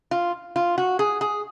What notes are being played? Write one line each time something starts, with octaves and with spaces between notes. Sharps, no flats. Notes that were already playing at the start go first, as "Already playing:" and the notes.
F4
F4
F#4
G#4
G#4